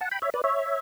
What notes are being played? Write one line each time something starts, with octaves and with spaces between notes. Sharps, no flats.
F#5 A5
G5 B5
C#5 E5
B4 D5
C#5 E5